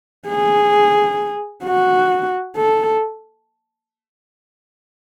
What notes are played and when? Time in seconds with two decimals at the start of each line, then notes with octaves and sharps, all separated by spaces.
0.28 G#4
1.64 F#4
2.57 A4